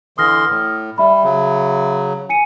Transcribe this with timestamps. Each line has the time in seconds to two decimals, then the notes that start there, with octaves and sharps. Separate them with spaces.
0.18 D3 E3 C6 D#6 F6 A#6
0.50 A2
0.98 G3 E5 B5
1.24 C#3 F#3
2.29 G#5 C#7 D#7